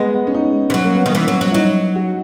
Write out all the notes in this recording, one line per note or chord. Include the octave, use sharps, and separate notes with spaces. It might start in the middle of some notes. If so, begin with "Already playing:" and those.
Already playing: G#3 B3
B3
C#4
D#4
E3
F#3 C#4
A#3
B3
D#3 C#4
E3
F#3
F#3
E4
F#3 D#4
F#4